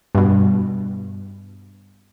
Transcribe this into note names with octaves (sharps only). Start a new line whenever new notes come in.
G2 B2